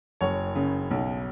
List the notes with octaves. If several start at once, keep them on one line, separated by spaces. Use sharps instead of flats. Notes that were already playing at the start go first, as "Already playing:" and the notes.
F#1 C#5
C#3
B1